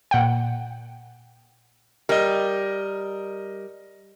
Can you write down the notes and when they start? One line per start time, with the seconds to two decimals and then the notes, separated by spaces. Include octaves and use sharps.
0.11 A#2 F#5 G5
2.09 G3 A#4 D#5